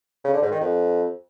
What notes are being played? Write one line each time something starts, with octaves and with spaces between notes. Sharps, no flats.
C#3
D3
G#2
D#3
F2